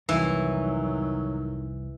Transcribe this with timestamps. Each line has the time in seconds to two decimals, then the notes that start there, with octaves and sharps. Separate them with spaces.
0.09 C2 F2 D#3 E3 F#3